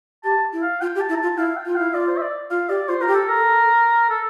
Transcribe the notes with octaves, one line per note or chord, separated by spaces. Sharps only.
G4 A5
E4
F5
F4 G5
G4
A5
E4
A#5
F4 A5
E4 F5
G5
F4
E4 F5
F4 D5
C5
E5
D5
F4 F5
G4 D5
F4 C5
F4 A#4
G4
A4
A#4
A4
A4